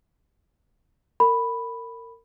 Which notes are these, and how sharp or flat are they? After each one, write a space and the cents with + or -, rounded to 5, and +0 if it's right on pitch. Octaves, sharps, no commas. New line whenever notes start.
A#4 -30 B5 +0